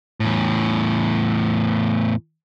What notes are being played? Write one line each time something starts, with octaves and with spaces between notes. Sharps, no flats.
E2 A2